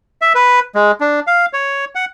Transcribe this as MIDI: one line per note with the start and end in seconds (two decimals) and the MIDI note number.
0.22 0.33 76
0.35 0.60 71
0.75 0.91 56
1.01 1.20 62
1.27 1.46 77
1.53 1.85 73
1.95 2.05 78